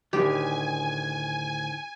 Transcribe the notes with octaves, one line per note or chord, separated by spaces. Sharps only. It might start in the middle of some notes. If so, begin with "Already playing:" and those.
D2 A2 D#3 G4 G#5